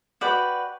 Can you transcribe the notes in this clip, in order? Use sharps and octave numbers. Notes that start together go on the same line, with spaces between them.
F#4 B4 D5 G5